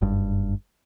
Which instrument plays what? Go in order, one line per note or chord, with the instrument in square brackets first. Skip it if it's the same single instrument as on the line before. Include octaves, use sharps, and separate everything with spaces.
[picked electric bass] F#1 G2